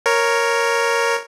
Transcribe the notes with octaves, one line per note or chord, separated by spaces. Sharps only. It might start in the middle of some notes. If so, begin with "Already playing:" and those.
A#4 C#5